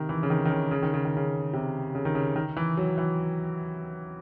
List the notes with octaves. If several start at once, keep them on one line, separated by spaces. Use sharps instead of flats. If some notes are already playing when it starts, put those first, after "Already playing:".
Already playing: C3 D#3
E3
C#3
D#3
D#3
C#3
C#3
D#3
C#3
D#3
C#3
C3
C#3
D#3
C#3
D#3
E3
F#3
E3